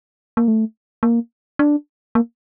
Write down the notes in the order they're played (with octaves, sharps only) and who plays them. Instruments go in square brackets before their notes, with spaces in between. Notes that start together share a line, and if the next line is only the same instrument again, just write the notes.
[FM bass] A#3
A3
A#3
D4
A#3